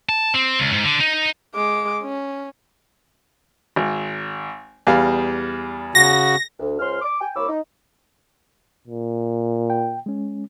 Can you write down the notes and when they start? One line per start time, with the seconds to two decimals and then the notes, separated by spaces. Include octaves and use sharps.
0.09 A5
0.34 C4
0.60 C#2
0.73 G#2
0.84 D3
1.00 D#4
1.55 G#3 D6
2.02 C#4
3.76 G#1
4.87 E2 G3 F5
5.95 C#3 F#4 A#6
6.60 D2
6.78 C#2 C#4 C5 C6 F6
7.02 D6
7.20 G5 G#5
7.35 C2 A#3 C#5 B5 D6 E6
7.49 D#4
8.87 A#2
9.70 G5
10.06 G#3 C#4